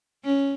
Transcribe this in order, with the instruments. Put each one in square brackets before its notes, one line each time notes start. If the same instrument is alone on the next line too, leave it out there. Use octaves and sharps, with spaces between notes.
[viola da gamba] C#4